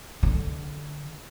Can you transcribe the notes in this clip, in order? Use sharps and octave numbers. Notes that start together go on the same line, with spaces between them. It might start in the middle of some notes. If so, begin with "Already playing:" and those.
D3